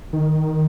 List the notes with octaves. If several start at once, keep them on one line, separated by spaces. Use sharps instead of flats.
D#3